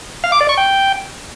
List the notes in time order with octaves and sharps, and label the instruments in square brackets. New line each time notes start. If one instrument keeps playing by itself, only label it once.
[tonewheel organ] F5
D6
D5
C#6
G5